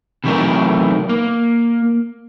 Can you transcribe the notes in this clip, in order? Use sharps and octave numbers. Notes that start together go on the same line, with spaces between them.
C3 E3 F#3 A3 D#4 A#4
A#3